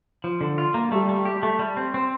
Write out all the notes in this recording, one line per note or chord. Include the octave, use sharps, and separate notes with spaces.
F3
D3
F4
A#3
G3 A3
A3
G4
A3
G3
C4
C4